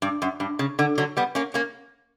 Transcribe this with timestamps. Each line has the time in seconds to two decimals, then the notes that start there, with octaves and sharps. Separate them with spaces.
0.02 G2
0.22 F#2
0.40 G2
0.59 C#3
0.79 D3
0.98 D3 F#3
1.17 G3 B3
1.35 A#3 C#4
1.54 A#3 C#4